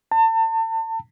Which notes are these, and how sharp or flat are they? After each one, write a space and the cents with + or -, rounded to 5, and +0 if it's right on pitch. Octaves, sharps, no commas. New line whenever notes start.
A5 +35